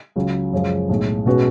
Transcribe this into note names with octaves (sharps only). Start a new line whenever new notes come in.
C#2 C#3 F#3
F#2 C#3 F3 G#3
B1 A2 G#3
B2 G#3 C#4 F#4 B4